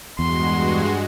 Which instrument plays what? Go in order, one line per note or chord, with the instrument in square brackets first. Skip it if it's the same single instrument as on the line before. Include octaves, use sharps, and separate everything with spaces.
[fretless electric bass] E2 [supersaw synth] G2 G#3 F#4 [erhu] C6